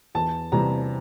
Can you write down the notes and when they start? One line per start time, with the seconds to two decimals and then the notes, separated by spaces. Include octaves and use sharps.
0.15 E2 A5
0.52 C3 E3 G3 A#5